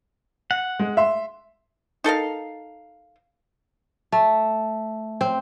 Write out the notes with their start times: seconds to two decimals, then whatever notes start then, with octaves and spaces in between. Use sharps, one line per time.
0.51 F#5
0.79 G#3
0.97 E5 C6
2.04 D#4 A4 A#4 F5
4.12 A3
5.21 C4